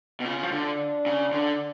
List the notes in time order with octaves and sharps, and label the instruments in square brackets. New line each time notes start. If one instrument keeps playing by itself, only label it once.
[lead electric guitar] B2
[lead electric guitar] C#3 [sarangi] F4
[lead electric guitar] F3
D3
[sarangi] D4
[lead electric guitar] C#3
D3